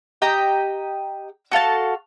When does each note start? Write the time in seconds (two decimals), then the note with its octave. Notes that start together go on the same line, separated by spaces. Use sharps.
0.22 G4 D#5 G5 A#5
1.52 F#4 A4 F5 A5